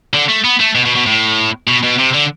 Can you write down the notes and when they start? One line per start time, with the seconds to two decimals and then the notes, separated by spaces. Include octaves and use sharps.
0.14 D3
0.29 A3
0.44 B3
0.60 A3
0.75 B2
0.85 B2
0.96 B2
1.06 A2
1.67 B2
1.83 B2
1.98 C3
2.14 D3